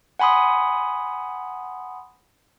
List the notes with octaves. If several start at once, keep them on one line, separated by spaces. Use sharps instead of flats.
F#5 G#5 B5 C6 D#6